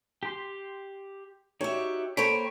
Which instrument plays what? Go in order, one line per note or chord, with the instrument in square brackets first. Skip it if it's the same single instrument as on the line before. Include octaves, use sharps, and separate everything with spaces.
[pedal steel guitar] G4 C6
[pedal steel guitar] D#4 F#4 G4 [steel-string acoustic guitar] C#5 E5
[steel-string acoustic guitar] A#3 C5 C#5 [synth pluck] A4 C#6 D7 [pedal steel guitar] G5 B5